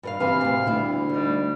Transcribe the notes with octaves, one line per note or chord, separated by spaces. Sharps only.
G2 A#4 F5
E2 C3 E3 B4 F5
D2 A2
D2 G3 B3 E4
G3 A3 D#4